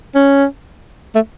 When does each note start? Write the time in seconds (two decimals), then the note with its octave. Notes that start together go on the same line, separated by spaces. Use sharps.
0.15 C#4
1.15 A3